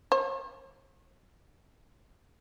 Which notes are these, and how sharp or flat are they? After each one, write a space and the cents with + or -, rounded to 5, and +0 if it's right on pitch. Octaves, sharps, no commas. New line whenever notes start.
C#5 -40